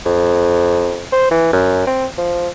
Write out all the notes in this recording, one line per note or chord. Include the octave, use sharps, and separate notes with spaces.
F2
C5
E3
F#2
C4
F3